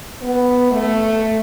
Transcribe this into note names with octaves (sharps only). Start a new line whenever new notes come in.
B3
A3